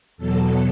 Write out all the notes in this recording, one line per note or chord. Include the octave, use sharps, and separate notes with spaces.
E2 B2 F#3 A4